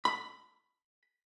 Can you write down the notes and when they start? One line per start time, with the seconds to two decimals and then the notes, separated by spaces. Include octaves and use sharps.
0.05 B5